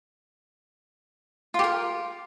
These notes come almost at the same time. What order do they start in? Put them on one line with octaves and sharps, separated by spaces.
F4 G4 A#4